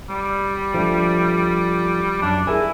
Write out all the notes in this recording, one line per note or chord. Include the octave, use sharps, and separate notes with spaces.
G3
F3 A3 D4
F#2 D4
E4 G#4 A#4 G#5